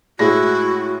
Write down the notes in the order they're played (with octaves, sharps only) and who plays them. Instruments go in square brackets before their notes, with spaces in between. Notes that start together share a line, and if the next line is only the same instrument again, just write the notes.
[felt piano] A2 G#3 A#6 [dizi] E4 [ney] F#4